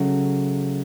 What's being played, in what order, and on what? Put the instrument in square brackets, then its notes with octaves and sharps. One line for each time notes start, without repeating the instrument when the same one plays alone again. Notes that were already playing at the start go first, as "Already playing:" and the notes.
Already playing: [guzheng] C#3 F#3 A3